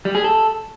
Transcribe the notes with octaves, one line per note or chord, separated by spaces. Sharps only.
G3
G#4
A4